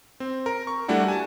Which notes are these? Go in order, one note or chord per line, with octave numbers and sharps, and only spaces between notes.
C4
A#4
C#6
G3 A3 D4 E4 F#4
G#5 A5